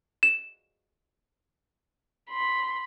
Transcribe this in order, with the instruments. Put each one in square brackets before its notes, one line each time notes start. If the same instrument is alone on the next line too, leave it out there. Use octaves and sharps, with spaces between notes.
[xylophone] E7
[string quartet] B5 C6